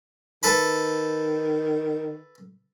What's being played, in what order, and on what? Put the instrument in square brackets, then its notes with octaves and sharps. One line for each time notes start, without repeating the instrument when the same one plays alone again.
[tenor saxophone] D#3 [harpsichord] A4 B4 B5